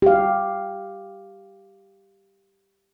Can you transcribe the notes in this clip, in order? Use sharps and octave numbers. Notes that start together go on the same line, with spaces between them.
G4 F5